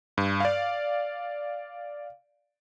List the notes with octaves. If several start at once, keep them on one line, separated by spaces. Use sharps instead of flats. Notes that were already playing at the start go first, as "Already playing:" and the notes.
G2
D5 F5